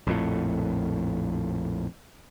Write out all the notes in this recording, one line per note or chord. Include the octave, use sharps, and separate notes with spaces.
A#1 F2 A2